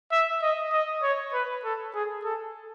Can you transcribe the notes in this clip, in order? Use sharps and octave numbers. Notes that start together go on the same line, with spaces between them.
E5
D#5
D#5
C#5
B4
A4
G#4
A4